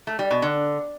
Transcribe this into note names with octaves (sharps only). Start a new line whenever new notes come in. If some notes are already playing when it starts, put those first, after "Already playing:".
A3
G3
B2
D3